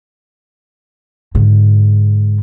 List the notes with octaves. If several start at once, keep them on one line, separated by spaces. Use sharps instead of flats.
G#2 D3